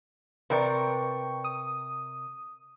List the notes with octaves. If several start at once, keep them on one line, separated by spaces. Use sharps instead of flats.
C3 A#4 B4 D5 G5 C#6
D#6